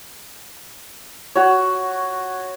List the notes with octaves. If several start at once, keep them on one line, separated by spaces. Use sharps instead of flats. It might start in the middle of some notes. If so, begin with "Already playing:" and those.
F#4 C#5